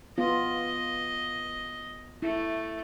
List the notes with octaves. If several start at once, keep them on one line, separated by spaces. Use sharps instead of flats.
B3 F4 D#5
A3 E4